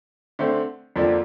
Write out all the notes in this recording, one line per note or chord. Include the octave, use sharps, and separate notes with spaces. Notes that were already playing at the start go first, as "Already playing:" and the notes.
D3 A3 C4
F2 D3 F3 A#3 D4